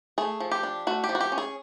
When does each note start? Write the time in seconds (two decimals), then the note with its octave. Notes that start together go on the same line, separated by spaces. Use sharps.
0.18 A3 G#4
0.40 F3
0.51 G4
0.63 D4
0.87 A3 F#4
1.04 G4
1.09 F3
1.15 F#4
1.20 G4
1.32 C#4
1.38 G#4